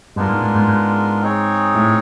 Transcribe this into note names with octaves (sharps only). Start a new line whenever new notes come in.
G2 G#3 B3 D4 F4 A#4
G#2
G#2
G#2
G#2
C4 D#4 G#4 C#5
A2